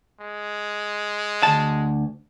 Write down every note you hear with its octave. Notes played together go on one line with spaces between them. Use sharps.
G#3
D2 A5